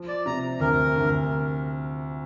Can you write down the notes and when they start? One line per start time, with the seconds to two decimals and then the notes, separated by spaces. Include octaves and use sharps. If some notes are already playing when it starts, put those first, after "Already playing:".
Already playing: F3
0.08 D5
0.26 C3 A#5
0.60 D2 A#4
0.96 D2